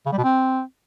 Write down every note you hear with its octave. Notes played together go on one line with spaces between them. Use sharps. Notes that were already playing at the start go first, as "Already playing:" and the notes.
C#3
G3
B2
C4